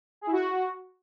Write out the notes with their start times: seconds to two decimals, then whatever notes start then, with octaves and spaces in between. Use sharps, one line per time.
0.21 G#4
0.27 E4
0.32 F#4